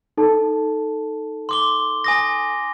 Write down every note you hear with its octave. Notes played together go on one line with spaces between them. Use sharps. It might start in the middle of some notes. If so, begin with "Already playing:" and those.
D#4 A4 A5
C6 D6 G7
G#5 D#6 A#6